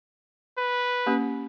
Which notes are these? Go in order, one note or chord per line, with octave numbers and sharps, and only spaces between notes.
B4
A#3 C#4 G4